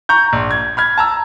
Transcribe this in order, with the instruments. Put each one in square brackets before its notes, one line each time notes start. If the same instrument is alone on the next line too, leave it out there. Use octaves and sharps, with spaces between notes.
[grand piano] A#5 C#6 G6
A#1
G#6
B5 F6 G#6
A5 A#5 E6